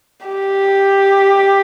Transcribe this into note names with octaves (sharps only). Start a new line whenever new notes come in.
G4